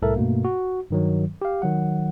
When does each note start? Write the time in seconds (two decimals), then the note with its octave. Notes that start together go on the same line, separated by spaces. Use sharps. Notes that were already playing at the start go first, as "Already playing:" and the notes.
0.02 C2 A2 A4 A#4 E5
0.16 G2 B2 A3 A#3
0.45 F#4
0.90 G2 D#3 F#3
1.42 G4 F5
1.62 D#3 F#3 F#5